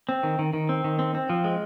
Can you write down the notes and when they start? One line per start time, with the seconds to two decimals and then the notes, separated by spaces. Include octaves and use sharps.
0.09 C4
0.23 D#3
0.39 D#3
0.53 D#3
0.69 C4
0.84 D#3
0.99 C4
1.15 C4
1.30 F3
1.44 G#3